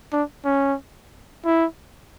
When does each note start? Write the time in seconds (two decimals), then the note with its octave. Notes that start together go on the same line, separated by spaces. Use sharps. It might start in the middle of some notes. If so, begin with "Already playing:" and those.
0.13 D4
0.45 C#4
1.45 E4